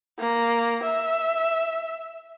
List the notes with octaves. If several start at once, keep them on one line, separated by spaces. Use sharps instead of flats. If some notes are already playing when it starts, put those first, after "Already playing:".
A#3
E5